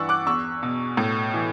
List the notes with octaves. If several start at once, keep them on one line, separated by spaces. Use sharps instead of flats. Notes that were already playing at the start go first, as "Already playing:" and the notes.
Already playing: G2 E3 D5 F#5 C#6 E6
D6 F#6
E2 C#6 E6
B2
A2
E3